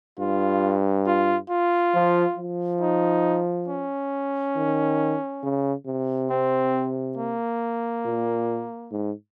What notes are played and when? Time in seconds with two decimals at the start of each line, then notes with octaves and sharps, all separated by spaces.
0.19 G2 F4
1.06 F4
1.50 F4
1.94 F3
2.37 F3
2.81 D#4
3.69 C#4
4.56 D#3
5.43 C#3
5.87 C3
6.30 C4
7.17 A#3
8.05 A#2
8.92 G#2